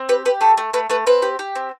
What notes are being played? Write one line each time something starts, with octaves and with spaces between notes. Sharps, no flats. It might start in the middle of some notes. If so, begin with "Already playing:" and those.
Already playing: C4
G4 B4
G4 B4
A3 A4
A3
A3 B4
A3 B4
C4 B4
G4
G4
C4